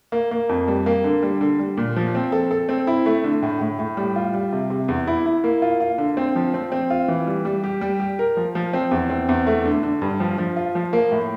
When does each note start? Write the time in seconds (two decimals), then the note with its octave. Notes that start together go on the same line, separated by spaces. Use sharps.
0.12 A#3
0.31 A#3
0.49 F2
0.68 G3
0.86 A#3
1.04 D3
1.23 G3
1.41 D3
1.59 G3
1.77 A#2
1.96 F3
2.15 C4
2.32 A4
2.51 A4
2.69 C4
2.87 E4
3.06 A3
3.24 D3
3.43 A2
3.61 A2
3.79 A2
3.97 G3
4.16 F4
4.34 G3
4.53 C3
4.70 C3
4.88 E2
5.08 E4
5.26 E4
5.44 A#3
5.62 F4
5.80 F4
5.98 D3
6.17 C4
6.35 F3
6.54 C4
6.72 C4
6.90 F4
7.08 E3
7.27 G3
7.45 G3
7.64 G4
7.81 G3
8.00 G4
8.19 A#4
8.37 F3
8.55 F3
8.73 C4
8.91 E2
9.10 C4
9.29 E2
9.47 A3
9.65 D3
9.83 D3
10.02 G2
10.20 F3
10.38 F3
10.56 F4
10.75 F3
10.93 A#3
11.12 A2